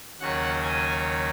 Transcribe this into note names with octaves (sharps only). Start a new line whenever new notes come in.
D#2 C#3 F#3 F#5
G#5